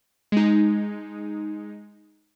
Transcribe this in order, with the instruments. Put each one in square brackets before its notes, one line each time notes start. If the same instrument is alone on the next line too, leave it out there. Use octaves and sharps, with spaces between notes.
[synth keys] G#3 D#4